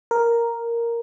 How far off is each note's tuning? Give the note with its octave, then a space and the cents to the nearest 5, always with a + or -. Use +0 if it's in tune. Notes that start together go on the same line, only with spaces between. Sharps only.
A#4 +0